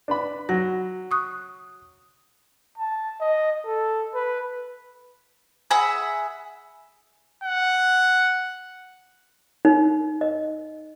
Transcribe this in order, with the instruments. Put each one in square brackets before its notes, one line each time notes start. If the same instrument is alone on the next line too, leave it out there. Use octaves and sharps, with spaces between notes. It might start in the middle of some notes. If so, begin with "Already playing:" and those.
[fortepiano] D4 B4 B5
[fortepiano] F#3 [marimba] F#5 A#6
[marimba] C#6 D#6 F#6
[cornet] A5
D#5
A4
B4
[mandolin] G#4 E5 F#5 B5
[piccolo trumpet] F#5
[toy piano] D#4
D#5